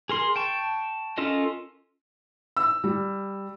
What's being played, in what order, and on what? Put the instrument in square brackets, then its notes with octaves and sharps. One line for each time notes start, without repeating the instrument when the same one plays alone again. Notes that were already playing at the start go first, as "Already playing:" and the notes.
[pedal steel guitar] G#4 A#4 C6
G5 A5 C#6
C#4 F4 A4 A#4 D#5
[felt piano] E6
G3